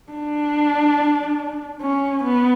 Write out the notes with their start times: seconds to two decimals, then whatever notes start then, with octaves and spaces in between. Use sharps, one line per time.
0.12 D4
1.82 C#4
2.24 B3